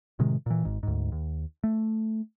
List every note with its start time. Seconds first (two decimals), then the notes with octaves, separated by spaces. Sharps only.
0.19 A2 C3 D#3 G#3
0.46 A#2 E3
0.65 G#1 G#2
0.83 D2 G#2
1.12 D#2
1.64 A3